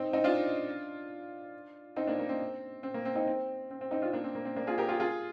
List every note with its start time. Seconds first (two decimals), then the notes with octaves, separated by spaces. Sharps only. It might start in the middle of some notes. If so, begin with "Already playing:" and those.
Already playing: C4 D#4
0.13 C4 D#4
0.24 D4 F4
1.96 C4 D#4
2.07 A#3 D4
2.19 A#3
2.29 C4
2.83 C4
2.94 A#3
3.05 C4
3.15 C4 D#4
3.27 C4
3.71 C4
3.81 C4
3.91 C4 D#4
4.02 D4 F4
4.13 A#3 D4
4.24 C4
4.35 A#3
4.45 C4
4.56 A#3 D4
4.67 F4 G#4
4.78 G4 A#4
4.88 F4 G#4
5.00 F4 G#4